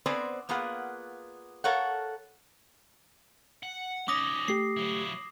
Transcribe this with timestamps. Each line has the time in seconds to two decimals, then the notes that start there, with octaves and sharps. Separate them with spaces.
0.06 B3 C4 C5 D5 G#5
0.49 A#3 B3 F4 G#4 F#5
1.64 A4 A#4 C#5 F5 F#5
3.63 F#5
4.08 C#4 D#4 D6 D#6 A#6
4.48 A3 G4 C7
4.77 F#3 E4